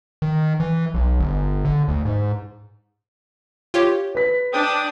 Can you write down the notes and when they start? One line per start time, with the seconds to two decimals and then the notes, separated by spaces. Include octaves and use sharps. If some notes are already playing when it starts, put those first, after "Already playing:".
0.22 D#3
0.60 E3
0.94 B1
1.20 G1
1.65 D3
1.88 D2
2.05 G#2
3.74 F4 G4 C#5
4.15 B4 B6
4.53 D4 G5 D#6